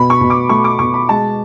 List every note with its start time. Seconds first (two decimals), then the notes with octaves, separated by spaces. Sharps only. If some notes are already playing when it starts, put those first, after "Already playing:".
Already playing: B2 B5
0.10 C#6
0.21 B2
0.30 D6
0.49 A3 C#6
0.64 D6
0.79 B2 C#6
0.94 B5
1.09 G#3 A5